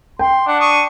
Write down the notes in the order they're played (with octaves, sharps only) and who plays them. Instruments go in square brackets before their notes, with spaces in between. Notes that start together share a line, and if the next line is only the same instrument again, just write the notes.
[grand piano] G5 [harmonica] C6
[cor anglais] D4 [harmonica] F#5
[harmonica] C#6 D#6